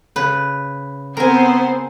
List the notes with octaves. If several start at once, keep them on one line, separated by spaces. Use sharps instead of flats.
C#3 B4
B3 C4 G#4 A#4 C5 G#5